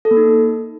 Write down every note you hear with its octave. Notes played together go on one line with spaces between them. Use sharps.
A4
A#3
D#4